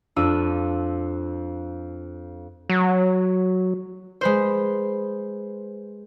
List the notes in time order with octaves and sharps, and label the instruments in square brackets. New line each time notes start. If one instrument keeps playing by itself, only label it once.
[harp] F2 D4 F4 E6 D#7
[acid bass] F#3
[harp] G#3 B4 C5